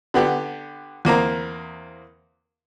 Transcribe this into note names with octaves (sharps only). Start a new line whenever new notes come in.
D3 B3 G4
E2 A#3 C4 A#5